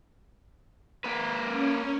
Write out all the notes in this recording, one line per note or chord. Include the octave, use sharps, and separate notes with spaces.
A#3 B4
C#4